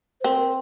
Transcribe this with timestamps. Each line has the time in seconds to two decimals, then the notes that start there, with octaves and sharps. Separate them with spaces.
0.21 C5
0.24 C4 A#4
0.39 A#4